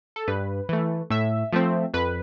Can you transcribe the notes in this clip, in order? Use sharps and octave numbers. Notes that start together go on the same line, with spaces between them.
A4
G2 B4
E3 A3
A2 E5
F3 A3 C4
F2 B4